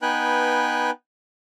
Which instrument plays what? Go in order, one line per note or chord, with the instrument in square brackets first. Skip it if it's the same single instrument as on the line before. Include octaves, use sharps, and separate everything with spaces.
[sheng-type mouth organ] B3 D#4 B4 G5 G#5 F#6